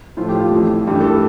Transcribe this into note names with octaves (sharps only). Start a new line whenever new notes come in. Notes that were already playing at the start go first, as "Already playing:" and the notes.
A2 F3 A3 F4
G4
F4
F2 E3 A3
G2 E3 A3 G4
A4